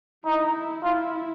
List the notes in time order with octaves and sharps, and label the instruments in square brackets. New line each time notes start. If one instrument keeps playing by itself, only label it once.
[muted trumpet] D#4 [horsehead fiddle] E4
[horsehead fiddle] E4 [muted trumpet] F4